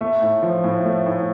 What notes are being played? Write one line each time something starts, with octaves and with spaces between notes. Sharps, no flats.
A3 E5
A2
F3
A2
A3
A2